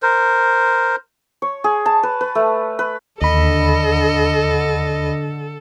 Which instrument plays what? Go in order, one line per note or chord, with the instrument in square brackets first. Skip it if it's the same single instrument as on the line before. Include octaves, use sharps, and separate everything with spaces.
[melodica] A#4 C5
[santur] C#5
G#4
A5
B4
B4
A3
B4
[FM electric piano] D#2 B5 [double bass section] D3 [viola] A4 [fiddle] D#5